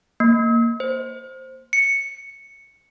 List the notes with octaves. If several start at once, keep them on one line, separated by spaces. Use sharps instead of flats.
A#3
C5
C#7